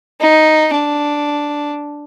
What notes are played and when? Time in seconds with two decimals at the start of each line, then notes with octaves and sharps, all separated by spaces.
0.21 D#4
0.74 D4